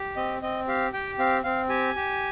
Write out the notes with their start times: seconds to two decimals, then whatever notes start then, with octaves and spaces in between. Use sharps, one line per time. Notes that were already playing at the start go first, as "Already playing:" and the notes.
Already playing: G4
0.16 C4 D#5
0.42 C4 D#5
0.68 G4 F5
0.93 G4 G5
1.19 C4 F5
1.44 C4 F5
1.69 G4 G#5
1.96 G4